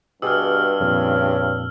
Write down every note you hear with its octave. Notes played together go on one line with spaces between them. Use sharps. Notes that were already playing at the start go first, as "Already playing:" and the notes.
G2 B2 G4 G#4 E6 F6
F2 A#2 C#3